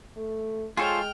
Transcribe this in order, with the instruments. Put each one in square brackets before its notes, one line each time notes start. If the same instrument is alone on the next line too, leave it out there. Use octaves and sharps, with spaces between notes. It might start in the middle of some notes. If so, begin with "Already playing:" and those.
[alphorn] A3
[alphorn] G#3 [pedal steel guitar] F4 A4 C5 [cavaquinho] G#4 C#5 [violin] G5 F6